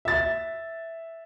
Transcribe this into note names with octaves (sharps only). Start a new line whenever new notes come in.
E5 A6